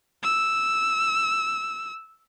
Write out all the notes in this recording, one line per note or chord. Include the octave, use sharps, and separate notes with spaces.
E6